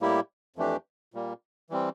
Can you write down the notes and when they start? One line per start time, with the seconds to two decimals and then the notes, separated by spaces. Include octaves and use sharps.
0.01 A2 G3 A#3 E4 G4
0.56 F2 E3 A3 D4 G4
1.14 A#2 G3 A#3
1.70 E3 G3 C4